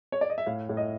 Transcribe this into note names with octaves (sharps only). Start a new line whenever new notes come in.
C#5
D5
D#5
E5
A2 F5
A2
D#5